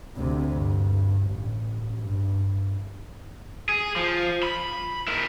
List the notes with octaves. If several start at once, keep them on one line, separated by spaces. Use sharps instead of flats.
D2 C3
G2
A1
G2
G#4
F3
B5
E4 A#4